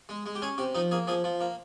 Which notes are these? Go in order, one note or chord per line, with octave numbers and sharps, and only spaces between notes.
G#3
G#3
G4
C#4 G#4
C3 G4
F3 D#4
A#3 G#4
F3 G#4
F3
A#3